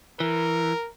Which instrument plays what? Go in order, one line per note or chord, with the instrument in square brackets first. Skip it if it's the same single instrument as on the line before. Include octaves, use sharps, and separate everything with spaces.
[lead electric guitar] E3 [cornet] A#4